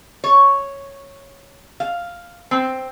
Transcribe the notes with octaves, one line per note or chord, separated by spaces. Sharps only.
C#5
F5
C4